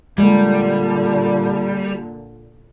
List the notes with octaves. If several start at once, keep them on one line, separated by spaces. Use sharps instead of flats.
A#2 D3 G3 G#3